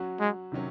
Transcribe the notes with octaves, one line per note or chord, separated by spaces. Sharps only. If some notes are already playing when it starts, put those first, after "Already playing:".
Already playing: F#3 C#4 F#4
G#3
C3 D#3 F#3 C#4